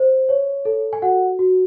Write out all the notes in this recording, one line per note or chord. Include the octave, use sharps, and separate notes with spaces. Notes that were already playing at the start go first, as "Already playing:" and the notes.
Already playing: C5
C#5
A4
G#5
F#4 F#5
F#4